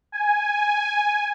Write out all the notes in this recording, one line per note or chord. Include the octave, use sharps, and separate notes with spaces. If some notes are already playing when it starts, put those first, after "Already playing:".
G#5